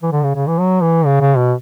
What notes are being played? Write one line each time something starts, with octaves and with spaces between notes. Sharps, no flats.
E3
D3
C#3
C#3
E3
F#3
E3
C#3
C#3
B2